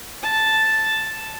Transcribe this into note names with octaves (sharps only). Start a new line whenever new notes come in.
A5